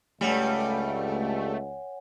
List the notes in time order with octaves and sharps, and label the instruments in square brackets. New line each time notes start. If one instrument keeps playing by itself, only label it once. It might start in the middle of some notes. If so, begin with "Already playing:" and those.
[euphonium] C#2 [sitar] G2 G3 [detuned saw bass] A3 [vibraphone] C#5 F#5 G#5